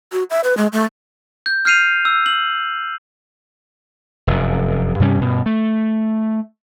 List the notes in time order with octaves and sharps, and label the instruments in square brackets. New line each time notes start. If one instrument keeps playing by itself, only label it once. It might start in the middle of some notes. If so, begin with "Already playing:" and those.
[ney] F#4
E5
B4
G#3
A3
[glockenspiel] G6
F6 G6 C7 D#7 F7
E6
F#7
[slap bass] F1 F#2
G2 C3 G3 C#4
G2 B2
A3